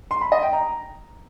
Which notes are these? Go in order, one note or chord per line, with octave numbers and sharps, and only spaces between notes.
C6
B5
D#5
G5
A#5